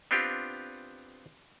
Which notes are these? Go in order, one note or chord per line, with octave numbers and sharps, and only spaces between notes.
B3 C4 D4 F4 G4